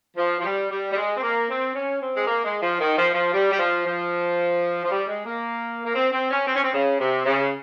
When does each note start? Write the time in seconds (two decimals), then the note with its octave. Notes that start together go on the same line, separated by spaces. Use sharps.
0.17 F3
0.40 F3
0.44 G3
0.71 G3
0.92 G3
0.96 G#3
1.16 C4
1.22 A#3
1.49 C4
1.75 C#4
2.02 C4
2.16 G#3
2.27 A#3
2.45 G#3
2.62 F3
2.80 D#3
2.98 F3
3.15 F3
3.33 G3
3.51 G3
3.59 F3
3.86 F3
4.84 F3
4.90 G3
5.08 G#3
5.25 A#3
5.85 A#3
5.95 C4
6.12 C4
6.31 C#4
6.47 C4
6.56 C#4
6.64 C4
6.74 C#3
7.00 C3
7.26 C#3